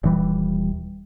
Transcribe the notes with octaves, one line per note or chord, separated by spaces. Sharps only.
D#1 E3 G3